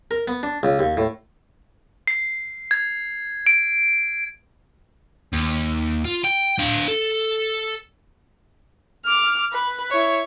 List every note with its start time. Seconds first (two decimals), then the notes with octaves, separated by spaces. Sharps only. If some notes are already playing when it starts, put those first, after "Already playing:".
0.11 A#4
0.28 B3
0.43 D4
0.63 C#2
0.79 D#2
0.97 A2
2.07 C7
2.71 G#6
3.47 D7
5.33 D#2
6.05 F4
6.25 G5
6.59 D4 F5
6.88 A4
9.04 D6 F6
9.53 B4
9.90 E4 C#5